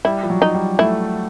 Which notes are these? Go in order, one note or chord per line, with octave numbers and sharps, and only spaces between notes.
G3 E4
F3
F#3
D#4
G3
A3 E4